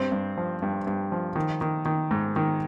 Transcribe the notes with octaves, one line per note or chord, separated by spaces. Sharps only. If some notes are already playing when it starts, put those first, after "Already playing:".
Already playing: G2 C4
G2
F3
G2
G2
F3
D#3
D#3
D#3
G#2
D#3